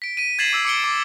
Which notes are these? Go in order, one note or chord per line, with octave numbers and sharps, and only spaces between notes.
B6 D7
B6 D#7
G#6 A6 B6 C7 E7 F#7
D6 E6 D#7 E7
D6 C#7 D7 G7
D6